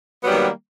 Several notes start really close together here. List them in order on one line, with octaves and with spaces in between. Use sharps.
B3 F#3 G3 D#3 A#3